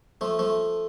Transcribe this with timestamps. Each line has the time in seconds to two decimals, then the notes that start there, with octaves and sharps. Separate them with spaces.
0.21 F3 A3
0.39 F3 A3